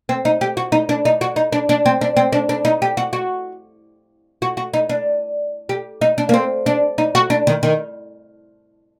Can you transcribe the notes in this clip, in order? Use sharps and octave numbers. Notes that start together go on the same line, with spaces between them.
C4
D#4
G4
F#4
D#4
D4
D#4
F#4
D#4
D4
D4
C4
D4
C4
D4
D4
D#4
G4
F#4
F#4
F#4
F#4
D#4
D4
G4
D#4
D4
A#3
C4
D4
D#4
F#4
D4
D#3
D#3